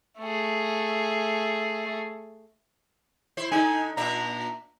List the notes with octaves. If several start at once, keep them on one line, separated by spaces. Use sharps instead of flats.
A3 G#4
E4 C5
D3 D#4 G#5
A#2 D4 E5 A#5